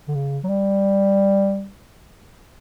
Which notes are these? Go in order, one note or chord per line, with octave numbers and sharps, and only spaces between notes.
D3
C#3
F#3
G3